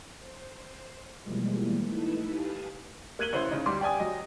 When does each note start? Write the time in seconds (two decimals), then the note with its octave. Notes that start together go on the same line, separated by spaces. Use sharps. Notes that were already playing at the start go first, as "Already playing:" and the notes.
0.18 C5
1.21 B2 E3 F3 G3 G#3 A#3
1.84 A3 D#4 E4 A4 B4 E5
2.26 G4 B4 F5 G#5 A5 D#6
3.19 A#3 F#6 G#6 D#7 F#7 G7
3.33 A1 C#3 E4 C5
3.51 C#3 D#4
3.66 D2 G3 C6 D6
3.81 G4 D5 G5 G#5 D#6
4.00 F#3 D#5